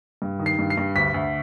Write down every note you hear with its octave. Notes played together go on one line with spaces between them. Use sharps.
G2
D#3
C7
G2
C7
G2
D2 B6
D2